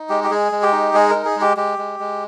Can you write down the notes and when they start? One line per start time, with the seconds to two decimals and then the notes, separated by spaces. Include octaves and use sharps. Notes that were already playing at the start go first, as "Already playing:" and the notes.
Already playing: D#4
0.09 G#3 G4
0.24 G4
0.31 G#3 G#4
0.52 G#3
0.63 G4
0.72 D#4
0.94 G#3 G#4
1.10 D#4 A#4
1.25 G#4
1.36 G#3 G4
1.57 G#3 G4
1.78 G#3
2.00 G#3